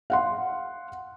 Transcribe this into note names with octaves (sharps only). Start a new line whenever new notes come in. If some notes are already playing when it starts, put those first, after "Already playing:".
F5 F#5 C6